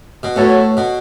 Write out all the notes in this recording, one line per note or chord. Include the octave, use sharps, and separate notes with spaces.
B2
A2 B3 F#4 A4 C#5
B2